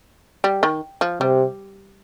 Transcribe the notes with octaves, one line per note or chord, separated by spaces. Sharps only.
G3
D#3
F3
C3 G3